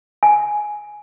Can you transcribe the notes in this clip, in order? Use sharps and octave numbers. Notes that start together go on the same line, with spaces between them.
G#5